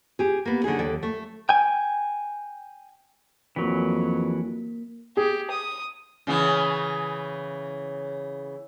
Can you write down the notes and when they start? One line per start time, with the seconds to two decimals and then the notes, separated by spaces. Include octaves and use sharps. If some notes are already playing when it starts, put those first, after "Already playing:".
0.19 G4 G#4
0.45 A#3 B3
0.64 D3 F#3 D#4 G#4
0.79 D#2 A4 D5
1.03 A3
1.49 G5 G#5
3.56 F2 E3 F#3 A#3 A#4 B6
5.17 G4 G#4
5.50 D#6
6.27 C#3 E3 B3